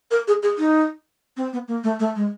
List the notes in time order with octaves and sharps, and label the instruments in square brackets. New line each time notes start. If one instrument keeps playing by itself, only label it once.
[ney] A#4
G#4
G#4
D#4
C4
B3
A#3
A3
A3
G#3